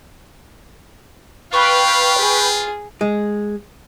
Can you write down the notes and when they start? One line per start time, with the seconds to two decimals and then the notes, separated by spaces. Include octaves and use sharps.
1.53 F4 B4 F5 G5 B5 C#6
2.18 G#4
3.01 G#3